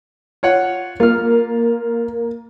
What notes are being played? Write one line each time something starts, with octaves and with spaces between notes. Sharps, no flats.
F4 C#5 F#5
A#3 F4 F6